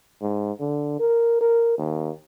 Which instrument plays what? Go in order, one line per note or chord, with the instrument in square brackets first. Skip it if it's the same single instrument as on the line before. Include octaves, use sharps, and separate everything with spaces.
[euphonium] G#2
D3
A#4
A#4
D#2